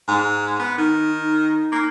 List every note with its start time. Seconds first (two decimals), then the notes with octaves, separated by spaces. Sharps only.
0.08 G#2
0.60 B3
0.78 D#3 D#4
1.22 D#4
1.72 A#3